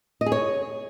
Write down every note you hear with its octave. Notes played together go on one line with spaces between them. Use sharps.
D#5
G#4
C#5